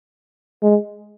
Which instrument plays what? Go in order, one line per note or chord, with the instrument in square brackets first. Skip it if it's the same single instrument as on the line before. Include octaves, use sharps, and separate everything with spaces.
[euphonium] G#3